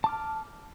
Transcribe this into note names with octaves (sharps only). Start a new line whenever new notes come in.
A5 D6 F6